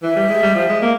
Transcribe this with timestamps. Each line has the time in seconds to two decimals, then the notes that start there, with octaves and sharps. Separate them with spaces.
0.03 E3 E5
0.16 G3
0.29 G#3
0.42 G3
0.55 F3
0.69 G#3
0.81 A#3